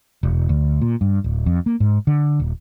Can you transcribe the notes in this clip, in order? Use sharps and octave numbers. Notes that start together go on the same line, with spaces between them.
E1
D2
A#2
G2
D1
F2
A#3
G#2
D3
D#1